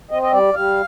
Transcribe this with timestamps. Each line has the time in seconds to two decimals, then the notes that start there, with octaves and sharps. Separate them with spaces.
0.11 C4 D#5
0.22 D#5
0.33 G3 D5
0.54 G3 F5